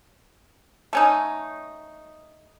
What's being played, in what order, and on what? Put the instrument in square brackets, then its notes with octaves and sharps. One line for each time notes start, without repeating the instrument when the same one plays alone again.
[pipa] A3 C#4 D#4